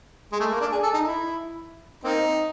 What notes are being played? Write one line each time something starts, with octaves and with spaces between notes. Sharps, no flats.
G#3
A3
A#3
D4
G#4
A4
D#4
E4
A#3 C4 D#4